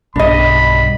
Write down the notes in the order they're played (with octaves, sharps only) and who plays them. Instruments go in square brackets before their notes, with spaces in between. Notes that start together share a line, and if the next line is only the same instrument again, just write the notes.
[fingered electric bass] B1 G2 [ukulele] D4 D#5 [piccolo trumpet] B5